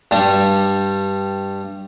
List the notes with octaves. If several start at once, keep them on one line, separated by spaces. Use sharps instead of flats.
G2 G3